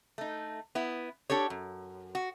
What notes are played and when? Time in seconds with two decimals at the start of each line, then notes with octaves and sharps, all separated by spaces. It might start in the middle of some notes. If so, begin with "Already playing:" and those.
0.18 A3 D#4
0.75 B3 E4
1.30 D4 G4 A4 C#5
1.50 F#2
2.15 F#4